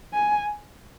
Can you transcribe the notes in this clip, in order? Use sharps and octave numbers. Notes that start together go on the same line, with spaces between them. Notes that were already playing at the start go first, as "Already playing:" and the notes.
G#5